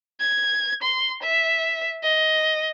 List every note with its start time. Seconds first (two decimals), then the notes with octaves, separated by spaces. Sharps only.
0.20 G#6
0.82 C6
1.22 E5
2.03 D#5